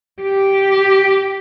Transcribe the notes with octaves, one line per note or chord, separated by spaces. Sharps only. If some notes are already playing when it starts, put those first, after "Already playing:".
G4